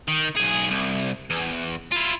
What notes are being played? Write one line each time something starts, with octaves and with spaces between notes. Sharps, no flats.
D#3
B1 G#4
C2
E2
E4 F4